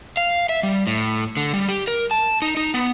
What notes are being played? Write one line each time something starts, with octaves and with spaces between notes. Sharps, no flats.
F5
E5
G3
A2
D3
G3
G4
A#4
A5
D#4
D#4
B3